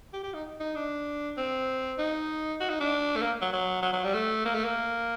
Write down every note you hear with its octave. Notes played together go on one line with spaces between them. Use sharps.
G4
G4
D#4
D#4
D4
C4
D#4
F#4
D#4
D4
A3
A#3
F#3
F#3
F#3
F#3
G3
A3
A#3
A3
A#3